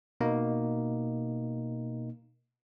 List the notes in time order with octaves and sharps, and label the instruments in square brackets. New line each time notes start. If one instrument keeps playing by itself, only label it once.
[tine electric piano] B2 A#3 D#4